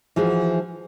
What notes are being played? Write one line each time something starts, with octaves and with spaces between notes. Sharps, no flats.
E3 F3 F#4 G#4